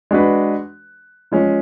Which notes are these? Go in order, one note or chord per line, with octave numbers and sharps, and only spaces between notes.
G#3 D4 F#4 B4
F3 G#3 C#4